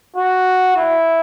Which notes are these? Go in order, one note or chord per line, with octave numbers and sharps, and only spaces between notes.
F#4
E4